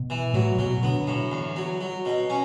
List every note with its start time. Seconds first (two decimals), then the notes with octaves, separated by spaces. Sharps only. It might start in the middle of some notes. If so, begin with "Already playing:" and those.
Already playing: B2
0.10 E3
0.34 A2 F#3
0.59 B2 F#3
0.83 D3 B3
1.07 A2
1.32 E2
1.56 F#3
1.81 F#3
2.05 B2
2.30 C#4